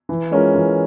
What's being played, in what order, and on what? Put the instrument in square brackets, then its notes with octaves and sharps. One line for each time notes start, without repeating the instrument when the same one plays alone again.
[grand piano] E3
G#3 C#4 F4 A#4
E3